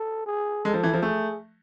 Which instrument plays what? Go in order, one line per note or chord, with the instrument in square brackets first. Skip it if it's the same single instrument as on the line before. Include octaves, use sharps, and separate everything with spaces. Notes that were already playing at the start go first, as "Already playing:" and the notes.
Already playing: [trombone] A4
G#4
[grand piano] G#3 [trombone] A4
[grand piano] F3
E3
F3
[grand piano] A3 [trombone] G#4